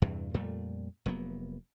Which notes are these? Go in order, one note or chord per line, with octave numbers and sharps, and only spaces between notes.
E2 G2 C3
F2 A#2 G3 A3
F1 F#3 A#3 B3